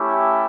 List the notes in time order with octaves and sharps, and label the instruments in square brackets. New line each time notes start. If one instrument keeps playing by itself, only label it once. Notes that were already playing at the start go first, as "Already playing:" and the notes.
Already playing: [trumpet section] A3 C#4 E4 G4